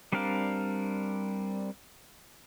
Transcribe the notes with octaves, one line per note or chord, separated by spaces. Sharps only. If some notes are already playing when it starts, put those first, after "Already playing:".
G3 C4 D4 A#4 F5